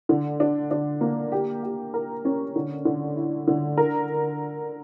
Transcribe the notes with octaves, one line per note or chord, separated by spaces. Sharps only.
D3
D4
D4
A#3
G4
G4
A#4
C#4
D3
D3
E4
D3
A#4